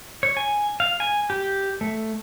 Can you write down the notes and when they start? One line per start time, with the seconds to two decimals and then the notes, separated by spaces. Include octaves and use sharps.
0.23 C#5
0.37 G#5
0.80 F5
1.00 G#5
1.30 G4
1.81 A3